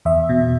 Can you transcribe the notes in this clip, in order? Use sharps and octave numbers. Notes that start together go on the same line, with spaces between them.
E2 E5
B2